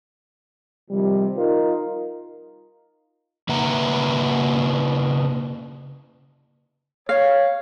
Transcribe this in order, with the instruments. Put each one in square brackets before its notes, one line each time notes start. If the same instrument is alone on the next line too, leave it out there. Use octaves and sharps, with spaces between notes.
[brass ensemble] C3 D#3 F3 G3
D#4 F4 A#4
[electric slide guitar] C#3 A#3 B4 E5 F#5 A#5
[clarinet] C#5 [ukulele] F5